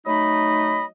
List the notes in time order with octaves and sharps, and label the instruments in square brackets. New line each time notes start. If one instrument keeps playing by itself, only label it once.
[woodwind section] F#3 A3 D#4 D#5 B5